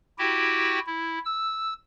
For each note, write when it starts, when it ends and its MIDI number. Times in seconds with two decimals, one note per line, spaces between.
0.19 0.79 64
0.19 0.79 66
0.19 0.79 67
0.19 0.79 79
0.87 1.19 64
1.25 1.73 88